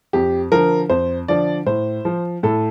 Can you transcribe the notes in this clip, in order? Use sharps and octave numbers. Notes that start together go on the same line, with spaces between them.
F2 G4
D3 F3 A#4
F2 C5
D3 F3 D5
A2 C5
F3
A2 A4